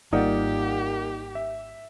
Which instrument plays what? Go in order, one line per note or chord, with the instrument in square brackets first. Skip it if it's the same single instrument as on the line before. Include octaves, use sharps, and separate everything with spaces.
[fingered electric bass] G#1 G3 [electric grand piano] A#3 F#5 [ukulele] D#4 F4 D5 [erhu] G4
[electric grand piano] E5